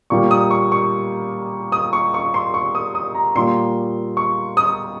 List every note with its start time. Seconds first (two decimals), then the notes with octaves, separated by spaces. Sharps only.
0.10 A#2 G3 A#3 C#6
0.31 D#6
0.51 C#6
0.72 C#6
1.72 D#6
1.93 C#6
2.14 C#6
2.34 C6
2.54 C#6
2.75 D#6
2.95 D#6
3.15 A#5
3.35 A#2 G3 A#3 C6
4.17 C#6
4.57 D#6